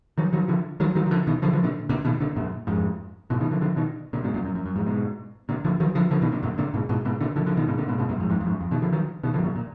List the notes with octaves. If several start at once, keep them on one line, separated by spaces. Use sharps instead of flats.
D#3 F#3
D#3 F#3
D3 F3
D#3 F#3
D#3 F#3
D#3
D3 F3
B2 D#3
D3 F3
D3 F3
A#2 D3
A#2 D3
B2 D#3
A#2 D3
F#2 A#2
F2 G#2
G#2 B2
B2 D#3
D3 F3
D3 F3
B2 D#3
A#2 D3
G#2 B2
F#2 A#2
F#2
F#2
F#2
F2 G#2
G#2 B2
A#2 D3
D3 F3
D#3 F#3
D3 F3
D3 F3
B2 D#3
A#2 D3
F#2 A#2
A#2 D3
G#2 B2
G#2 B2
G#2 B2
A#2 D3
D3 F3
D3 F3
B2 D#3
G#2 B2
A#2 D3
G#2 B2
G#2 B2
F#2 A#2
F2 G#2
F2 G#2
F2
G#2
F#2
F2
B2 D#3
D3 F3
D#3 F#3
B2 D#3
D3 F3
G#2
F#2 A#2
A#2